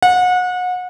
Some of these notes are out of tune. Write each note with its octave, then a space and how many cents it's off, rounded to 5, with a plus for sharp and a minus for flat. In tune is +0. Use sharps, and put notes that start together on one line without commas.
F#5 -30